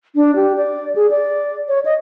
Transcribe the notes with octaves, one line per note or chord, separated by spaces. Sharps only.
D4
G4
D5
G#4
D5
C#5
D#5